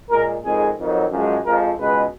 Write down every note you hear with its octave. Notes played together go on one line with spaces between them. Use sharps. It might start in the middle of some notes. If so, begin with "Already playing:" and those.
A#2 G#3 A#4
F2 D#3 G#3 G#4
F2 D#3 F#3
F#2 F3 G#3
F2 F3 G#3 A#4
C#2 B2 G#3 B4